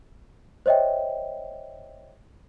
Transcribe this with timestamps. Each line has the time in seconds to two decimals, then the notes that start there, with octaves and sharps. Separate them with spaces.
0.66 C5 C#5 D#5 E5 G5